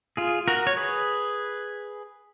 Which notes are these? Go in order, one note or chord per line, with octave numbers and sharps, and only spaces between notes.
F4 G#4
F#4 A#4
C#5
G#4 B4